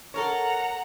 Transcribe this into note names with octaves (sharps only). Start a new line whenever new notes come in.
A4 A#4 C#5 F#5 A#5